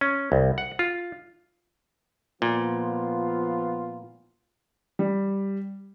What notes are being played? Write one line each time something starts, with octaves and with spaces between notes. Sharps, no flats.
C#4
C2
F#5
F4
A#2 F3 B3 F4
G3